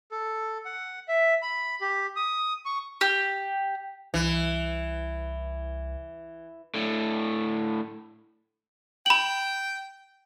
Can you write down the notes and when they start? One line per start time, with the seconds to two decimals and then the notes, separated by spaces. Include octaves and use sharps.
0.11 A4
0.65 F#5
1.08 E5
1.42 B5
1.81 G4
2.16 D#6
2.65 C#6
3.01 G4
4.14 C2 E3
6.74 A2 D3
9.06 G5 B5 F#7